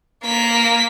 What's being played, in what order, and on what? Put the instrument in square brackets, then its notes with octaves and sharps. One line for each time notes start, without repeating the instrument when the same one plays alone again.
[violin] A#3 B6